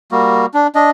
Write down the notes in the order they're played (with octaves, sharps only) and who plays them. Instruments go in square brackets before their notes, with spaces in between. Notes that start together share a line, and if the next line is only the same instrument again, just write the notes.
[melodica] G3 A#3 F#4
D4
D4 D#5